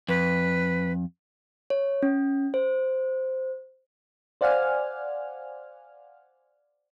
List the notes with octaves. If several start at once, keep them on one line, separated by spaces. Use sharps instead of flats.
F2 B4
C#5
C#4
C5
C5 D5 F5 F#5 G#5 F6